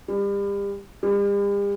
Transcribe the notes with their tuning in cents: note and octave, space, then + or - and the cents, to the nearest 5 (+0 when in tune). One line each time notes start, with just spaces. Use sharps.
G3 +35
G3 +45